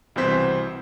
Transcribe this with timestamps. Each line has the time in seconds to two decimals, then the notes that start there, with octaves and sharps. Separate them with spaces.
0.16 C2 B2 E3 C4 C5 B6